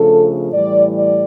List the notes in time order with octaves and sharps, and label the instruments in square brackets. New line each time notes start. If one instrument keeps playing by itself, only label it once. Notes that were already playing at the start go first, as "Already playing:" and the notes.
Already playing: [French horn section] C#3 F3 A3 D4 A4
A2 E3 G3 D5
D5